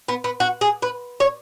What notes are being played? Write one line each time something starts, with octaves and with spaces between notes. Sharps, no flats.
B3
B3
F#4
G#4
B4
C#5